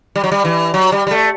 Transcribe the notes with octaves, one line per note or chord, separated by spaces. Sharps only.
G3
F#3
G3
E3
F#3
G3
G3
A3